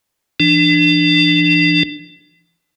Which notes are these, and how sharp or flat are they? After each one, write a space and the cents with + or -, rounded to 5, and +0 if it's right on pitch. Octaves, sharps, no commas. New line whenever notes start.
E3 +40 D4 +20